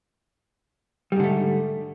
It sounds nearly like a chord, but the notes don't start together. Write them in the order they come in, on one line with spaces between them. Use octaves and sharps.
G3 G#2 D3 A3